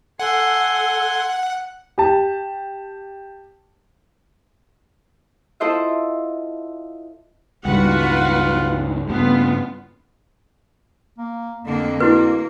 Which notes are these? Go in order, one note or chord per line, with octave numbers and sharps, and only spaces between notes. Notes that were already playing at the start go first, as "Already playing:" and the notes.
A4 F#5 G#5 C6
G4 A5
E4 F4 A4 C5 D#5 E5
C#2 G2 D#3 G3 F4 F#4 B4 F#5
G2 C#3 A3 B3 F4
A#3
F2 D3 A#3
A#3 E4 F#4 B4